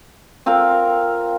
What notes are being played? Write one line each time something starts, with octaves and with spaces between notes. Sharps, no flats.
C4 F4 A#4 F5